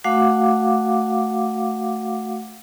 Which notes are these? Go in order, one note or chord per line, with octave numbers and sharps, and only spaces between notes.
A3 F#4 F5 F#5 D6